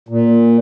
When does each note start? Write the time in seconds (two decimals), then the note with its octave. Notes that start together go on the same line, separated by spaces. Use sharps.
0.08 A#2